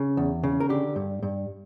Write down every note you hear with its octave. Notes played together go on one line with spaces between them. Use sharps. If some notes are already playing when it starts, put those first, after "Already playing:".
Already playing: C#3
E2
C#3
A#4
D3 G4
G2
G2